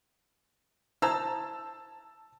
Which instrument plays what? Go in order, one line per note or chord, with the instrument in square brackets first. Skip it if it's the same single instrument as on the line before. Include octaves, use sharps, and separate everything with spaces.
[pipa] E4 C5 A#5 [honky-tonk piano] A5 E6